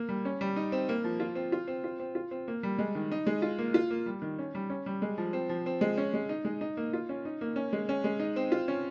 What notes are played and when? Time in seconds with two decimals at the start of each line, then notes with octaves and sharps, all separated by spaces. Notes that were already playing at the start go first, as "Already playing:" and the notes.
Already playing: A#3
0.09 G3
0.25 C#4
0.41 G3
0.56 D#4
0.72 C4
0.89 A#3
1.04 F3
1.20 F4
1.35 C4
1.52 F4
1.68 C4
1.84 F4
1.99 C4
2.15 F4
2.31 C4
2.48 A#3
2.63 G3
2.79 G#3
2.95 D#3
3.12 D#4
3.27 G#3
3.42 F4
3.58 A#3
3.74 F4
3.90 A#3
4.06 G3
4.22 D#3
4.39 C#4
4.55 G3
4.70 C#4
4.86 G3
5.02 G#3
5.18 F3
5.33 C4
5.49 F3
5.66 C4
5.81 G#3
5.98 C#4
6.14 G#3
6.29 D#4
6.45 G#3
6.61 D#4
6.77 A#3
6.93 F4
7.09 C#4
7.25 D#4
7.41 A#3
7.56 C#4
7.73 G#3
7.89 C#4
8.04 G#3
8.20 D#4
8.36 C4
8.52 F4
8.68 C#4